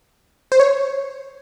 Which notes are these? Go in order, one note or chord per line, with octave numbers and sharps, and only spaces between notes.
C5
C#5